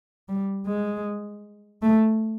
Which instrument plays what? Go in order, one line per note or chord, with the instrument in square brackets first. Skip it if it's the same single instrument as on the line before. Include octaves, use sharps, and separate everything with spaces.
[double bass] G3
G#3
A3